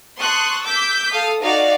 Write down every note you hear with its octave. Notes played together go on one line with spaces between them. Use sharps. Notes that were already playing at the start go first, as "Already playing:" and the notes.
A5 C6 C#6 D#6 F#6
D6 E6 G6 B6
A4 F5 D#6
D#4 F#4 D5 F5